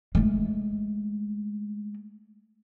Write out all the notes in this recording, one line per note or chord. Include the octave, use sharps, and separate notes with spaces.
G#3 A3